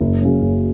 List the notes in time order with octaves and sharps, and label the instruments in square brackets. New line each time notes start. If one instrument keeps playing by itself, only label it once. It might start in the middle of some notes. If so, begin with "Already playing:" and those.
[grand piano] F#1
F#2 C#3
F#1